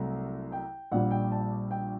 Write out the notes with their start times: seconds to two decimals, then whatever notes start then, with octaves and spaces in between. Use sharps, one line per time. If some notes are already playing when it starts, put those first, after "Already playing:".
Already playing: C2 C3 F#3 A3
0.52 G5
0.92 A#1 A#2 G3 F#5
1.11 G5
1.32 A5
1.71 G5